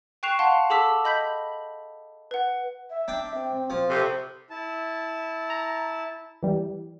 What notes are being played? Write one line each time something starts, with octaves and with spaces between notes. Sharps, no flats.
G5 C#6 F#6 C7 E7 F7
F5 F#5 A5 C6
G#4 A4 A5 D6 E6 B6
D#5 B5 G6 B6 F#7
B4 F#5
E5
D4 G5
C4
F3
C3 A4
E4 A5
A#5
E3 G3